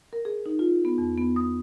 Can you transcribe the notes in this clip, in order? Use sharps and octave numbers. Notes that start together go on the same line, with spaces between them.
A#4
G#4
D#4
F4
B3
E2
B3
D#6